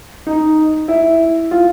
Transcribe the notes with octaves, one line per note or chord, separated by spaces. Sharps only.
D#4
E4
F4